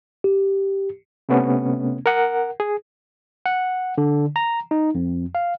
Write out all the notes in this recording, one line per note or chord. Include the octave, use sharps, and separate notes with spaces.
G4
C3 A3 B3 C#4
A#4 F#5
G#4
F#5
D3
A#5
D#4
F2
F5